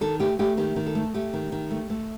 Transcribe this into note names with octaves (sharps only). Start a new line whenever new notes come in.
D#3 A4
A3 G4
A3 G4
D#3 G4
D#3
A4
A3
A3 G4
D#3
D#3
A3
A3